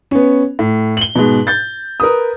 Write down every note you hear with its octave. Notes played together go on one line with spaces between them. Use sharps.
B3 C#4
A2
F#7 G7
G#2 B2
G6 A6
A#4 B4 D#6